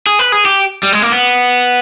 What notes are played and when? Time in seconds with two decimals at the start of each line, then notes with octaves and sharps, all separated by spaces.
0.06 G#4
0.19 B4
0.32 G#4
0.45 G4
0.83 G3
0.92 G#3
1.02 A#3
1.12 B3